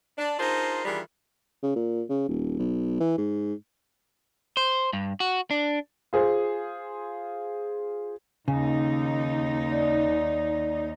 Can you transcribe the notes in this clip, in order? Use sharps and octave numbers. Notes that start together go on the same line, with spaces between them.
D4
D4 D#4 F4 G#4 A#4 C5
D#3 E3 G3 D4 F4 G#4
C#3
A#2
C#3
D#1
B1
E3
G#2
C5
G2
F#4
D4
F4 G#4 C5
D#2 C#3 D#4
D5